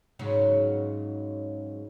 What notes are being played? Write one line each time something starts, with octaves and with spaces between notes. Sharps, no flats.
G#2 C#3 F#3